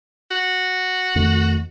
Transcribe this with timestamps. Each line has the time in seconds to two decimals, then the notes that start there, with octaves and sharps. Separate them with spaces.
0.31 F#4
1.15 F2 D#3 A3